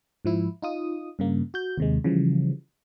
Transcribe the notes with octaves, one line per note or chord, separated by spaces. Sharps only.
G#2 F3 E4
D#4 F4 D#6
G2 C#3 A#3
F#4 G6
D#2 C3 G#3
C#3 E3 F3 G3